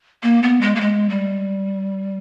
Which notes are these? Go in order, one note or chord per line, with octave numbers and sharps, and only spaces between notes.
A#3
B3
G#3
A#3
G#3
G3